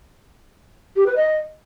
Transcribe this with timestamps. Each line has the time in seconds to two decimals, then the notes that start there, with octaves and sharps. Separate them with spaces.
0.96 G4
1.06 B4
1.16 D#5